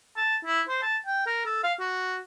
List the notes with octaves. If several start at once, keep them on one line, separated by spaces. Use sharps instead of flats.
A5
E4
C5
A5
G5
A#4
A4
F5
F#4